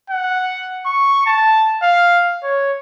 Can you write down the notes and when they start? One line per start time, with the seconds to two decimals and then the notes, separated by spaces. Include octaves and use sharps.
0.10 F#5
0.86 C#6
1.26 A5
1.83 F5
2.44 C#5